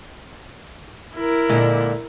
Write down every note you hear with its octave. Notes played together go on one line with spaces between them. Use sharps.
E4 A#4
A#2 D3 G#3